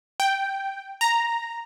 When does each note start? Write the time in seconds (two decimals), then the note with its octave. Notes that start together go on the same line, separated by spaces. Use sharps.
0.20 G5
1.01 A#5